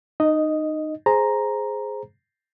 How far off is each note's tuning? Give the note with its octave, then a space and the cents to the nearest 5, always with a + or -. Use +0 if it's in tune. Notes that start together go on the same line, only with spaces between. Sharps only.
D#4 -20 D#5 +0
G#4 +5 C5 +0 A#5 +0